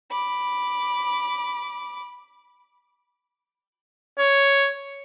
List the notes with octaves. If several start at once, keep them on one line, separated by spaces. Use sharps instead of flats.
B5 D6
C#5